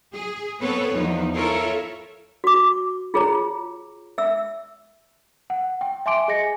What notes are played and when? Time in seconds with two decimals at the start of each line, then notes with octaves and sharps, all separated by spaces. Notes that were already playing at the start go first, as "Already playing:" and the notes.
0.14 G#4
0.61 B3 C4 A4 B4 C#5
0.94 E2 F3 B3 D#4
1.35 E4 F4 A4 A#4 C#5
2.44 F#4 D6
3.14 F4 G#4 C#5 A#5
4.18 E5 E6
5.50 F#5
5.81 G5
6.06 E5 G#5 C6 D6 D7
6.28 G#4 D#5 G#5 A#6 C#7